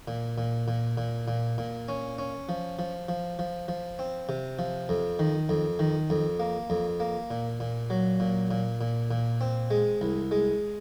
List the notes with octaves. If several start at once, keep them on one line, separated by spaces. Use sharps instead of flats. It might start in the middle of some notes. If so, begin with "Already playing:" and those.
A#2
A#2
A#2
A#2
A#2
A#2
C#4
C#4
F3
F3
F3
F3
F3
C4
C3
F3
F2
D#3
F2
D#3
F2
A#3
F2
A#3
A#2
A#2
F#3
A#2
A#2
A#2
A#2
C4
G#3
C2
G#3